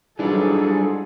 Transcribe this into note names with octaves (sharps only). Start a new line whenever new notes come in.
G#2 E3 F#3 G3 D4 F4 G#4 A4